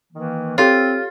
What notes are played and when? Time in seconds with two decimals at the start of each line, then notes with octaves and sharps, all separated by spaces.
0.13 D#3 E3 A#3
0.58 C4 F4 G4 A4 C#5